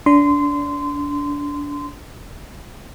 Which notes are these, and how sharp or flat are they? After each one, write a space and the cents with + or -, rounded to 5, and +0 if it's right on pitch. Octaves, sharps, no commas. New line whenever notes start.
D4 -25 C6 -20